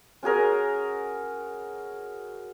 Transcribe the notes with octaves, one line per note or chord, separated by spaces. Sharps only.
C#4 F#4 G#4 A#4